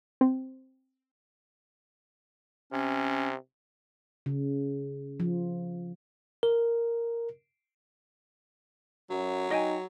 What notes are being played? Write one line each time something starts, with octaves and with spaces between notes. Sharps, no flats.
C4
C3 C#4
C#3
F3
A#4
F#2 F#3
D#4 D#5 G5 G#5